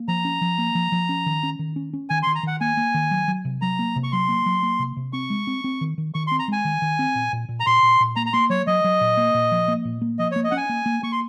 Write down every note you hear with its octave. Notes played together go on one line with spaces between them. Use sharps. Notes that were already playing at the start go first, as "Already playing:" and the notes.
Already playing: A#3
F3 A#5
C#4
F3
A#3
F3
F3
C#4
D#3
C#4
D#3
C#4
C#4
D#3 G#5
C6
D#3
A#5
D#3 F#5
A#3 G#5
A#3
D#3
F#3
F#3
C3
F#3 A#5
A#3
C3
C#6
F#3 C6
A#3
F#3
A#3
C3
C3
C4 C#6
G#3
C4
C4
D#3
D#3
D#3 C#6
C6
C4
A#5
G#3 G#5
D#3
D#3
C4
A#2
A#2
A#2
A#5
A#2 C6
A#2
A#2
A#3 A#5
A#5
A#3 C6
F#3 C#5
F#3 D#5
F#3
A#2
A#3
A#2
F3
A#3
A#2
A#3
F3 D#5
C#5
A#3
D#5
C#4 F#5
G#5
A#3
A#3
A#3 C#6
C6